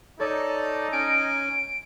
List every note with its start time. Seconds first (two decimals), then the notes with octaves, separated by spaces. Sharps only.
0.20 D#4 A4 C#5 D5 A5 D#7
0.92 C#4 G#5 D7